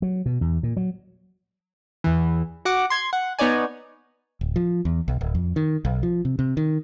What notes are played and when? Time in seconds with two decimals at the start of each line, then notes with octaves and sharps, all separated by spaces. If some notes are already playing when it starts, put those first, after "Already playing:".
0.02 F#3
0.26 B2
0.41 E2
0.63 A#2
0.77 F#3
2.04 E2 E3
2.65 F#4 F#5 D6
2.90 C6 G#6
3.13 F#5
3.39 B3 D#4 C#5 D5 G#5
4.41 D1
4.56 F3
4.85 E2
5.08 B1
5.21 D1
5.35 F2
5.56 D#3
5.85 B1
6.03 F3
6.25 C3
6.39 C3
6.57 D#3